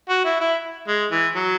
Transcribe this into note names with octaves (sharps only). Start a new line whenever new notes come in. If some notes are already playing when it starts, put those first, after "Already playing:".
F#4
E4
E4
G#3
E3
F#3